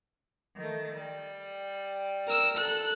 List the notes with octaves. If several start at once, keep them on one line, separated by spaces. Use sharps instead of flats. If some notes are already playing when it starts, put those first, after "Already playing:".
D#3 A3
G3
A#4 E6
A4 F#6